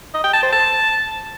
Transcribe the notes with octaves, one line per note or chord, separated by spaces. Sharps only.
D#5
G5
A5
C5
A5